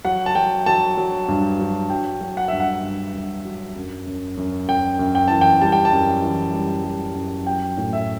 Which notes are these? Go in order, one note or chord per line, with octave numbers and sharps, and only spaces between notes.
F#3 F#5
A5
F#3 G5
F#3 A5
F#3
G2
F#3
F#3 G5
F#3
F#5
G2 E5
F#5
G2
G2
F#3
F#2
F#2
F#2
F#2 G5
F#2
G5
E3 A5
G5
G3 A5
G5
A5
F#2
E3
G3
G3
F#2
F#3 G5
A2
E5